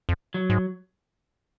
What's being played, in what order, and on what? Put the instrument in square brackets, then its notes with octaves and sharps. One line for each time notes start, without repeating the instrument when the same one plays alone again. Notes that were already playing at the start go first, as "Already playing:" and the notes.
[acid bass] F2
[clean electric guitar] F#3
[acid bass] G#2